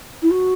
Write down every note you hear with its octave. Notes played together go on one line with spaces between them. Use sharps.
E4
F#4